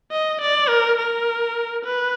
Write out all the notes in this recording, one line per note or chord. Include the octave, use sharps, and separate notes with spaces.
D#5
D5
A#4
A#4
B4